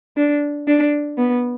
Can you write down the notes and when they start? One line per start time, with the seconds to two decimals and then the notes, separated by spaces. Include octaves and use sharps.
0.17 D4
0.67 D4
1.18 B3